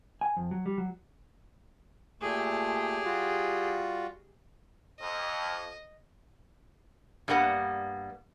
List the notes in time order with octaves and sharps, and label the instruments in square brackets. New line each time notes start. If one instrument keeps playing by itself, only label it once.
[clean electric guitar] G#5
F2
F#3
G3
F#3
[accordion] A#2 A3 [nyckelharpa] G4 G#4
[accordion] G3 F4 F#4
[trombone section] F2 [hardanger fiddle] D#5
[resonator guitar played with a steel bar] G2 G3 A#3 B3 F#5